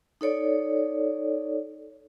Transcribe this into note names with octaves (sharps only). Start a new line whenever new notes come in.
D#4 A4 C#5 D5